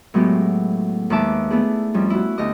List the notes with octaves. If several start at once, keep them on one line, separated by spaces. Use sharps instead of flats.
A2 F#3 G#3 B3 E4 G4
D#2 G#3 B4 E5 A5 D6
A3 B3 D4 E4 G#4
F2 G3 C#4
E4 F#4
D2 A3 G4 D#5 D#6